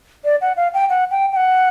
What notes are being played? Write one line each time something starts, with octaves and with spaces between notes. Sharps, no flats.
D5
F#5
F5
G5
F#5
G5
G5
F#5